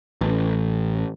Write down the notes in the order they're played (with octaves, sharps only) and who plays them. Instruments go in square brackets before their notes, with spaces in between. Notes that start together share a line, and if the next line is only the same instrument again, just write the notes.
[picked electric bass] A1